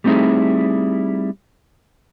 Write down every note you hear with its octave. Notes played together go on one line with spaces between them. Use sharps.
G3 A3 C4 D#4 E4 G#4